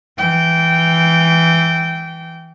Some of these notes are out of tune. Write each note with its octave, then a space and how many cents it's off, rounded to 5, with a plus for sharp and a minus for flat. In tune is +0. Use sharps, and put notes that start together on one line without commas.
E3 +0 G5 -15